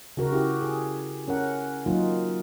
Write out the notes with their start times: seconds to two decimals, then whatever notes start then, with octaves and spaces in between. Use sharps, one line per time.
0.17 C#3 F#4 A#4
0.33 E4 F#4 G4
0.61 G#4
1.28 C#4 A#4 F#5
1.86 F#3 A#3 D#4 F4